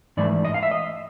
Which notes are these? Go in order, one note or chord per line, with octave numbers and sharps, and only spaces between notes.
G#2 E3 A3 D5
D#5
F5
E5
D#5